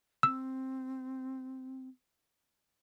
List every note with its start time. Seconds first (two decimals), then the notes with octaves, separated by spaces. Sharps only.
0.23 C4 E6